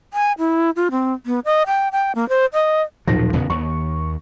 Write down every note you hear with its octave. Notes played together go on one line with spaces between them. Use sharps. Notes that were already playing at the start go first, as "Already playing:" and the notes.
G#5
E4
F4
C4
B3
D#5
G5
G5
A#3
C5
D#5
D#1 B1 F3 F#3 A#6
E2 C#3 B3
D#2 C#6